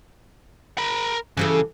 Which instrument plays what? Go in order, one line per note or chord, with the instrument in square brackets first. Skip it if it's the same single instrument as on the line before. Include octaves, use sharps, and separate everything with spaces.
[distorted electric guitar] A#4 B5
[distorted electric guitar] C#3 [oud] E3 G4 A4